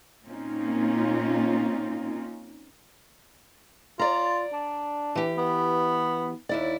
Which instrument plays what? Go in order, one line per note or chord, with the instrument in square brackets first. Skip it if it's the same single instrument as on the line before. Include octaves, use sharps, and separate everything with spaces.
[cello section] A#2 A#3 C4 C#4 D#4 F4
[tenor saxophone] F4 [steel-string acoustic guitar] D5 A#5
[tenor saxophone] D4
[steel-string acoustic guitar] E3 G4
[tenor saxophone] B3
[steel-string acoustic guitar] D#2 E4 D5